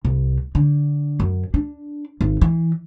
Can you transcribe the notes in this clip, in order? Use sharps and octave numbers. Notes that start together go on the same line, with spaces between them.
C2
D3
F#2
D4
G#1
E3